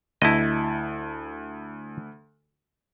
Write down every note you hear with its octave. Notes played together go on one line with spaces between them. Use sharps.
D2 E4 D#5 A5